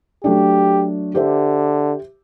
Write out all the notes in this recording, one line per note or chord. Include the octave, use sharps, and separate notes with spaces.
F#3 A3 D4 G4
D3 G4 C5 E5